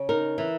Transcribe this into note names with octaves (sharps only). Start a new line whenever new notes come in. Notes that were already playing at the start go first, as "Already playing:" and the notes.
Already playing: C#3
D#4 A#4
E3